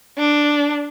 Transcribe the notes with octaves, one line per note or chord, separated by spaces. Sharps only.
D4